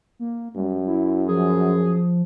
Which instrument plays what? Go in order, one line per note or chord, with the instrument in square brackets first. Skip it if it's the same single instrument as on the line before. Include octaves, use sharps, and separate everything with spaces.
[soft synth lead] A#3
[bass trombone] F#2 [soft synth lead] G3
[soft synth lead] E4
[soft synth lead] F3 [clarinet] G#4